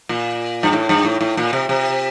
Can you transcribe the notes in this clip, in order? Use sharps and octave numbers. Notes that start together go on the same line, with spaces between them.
A#2
G2
A2
G2
A2
A2
A#2
C3
C3